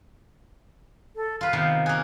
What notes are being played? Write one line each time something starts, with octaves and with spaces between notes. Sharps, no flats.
A4
F4 B4 F5
C3 D#3 B3
A#3 G#4 F#6